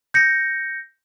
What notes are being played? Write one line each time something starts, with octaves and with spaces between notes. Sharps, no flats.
G6 A#6 C#7